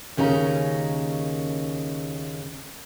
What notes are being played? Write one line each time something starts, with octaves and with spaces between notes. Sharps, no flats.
D#2 C#3 C#4 D#4 A#5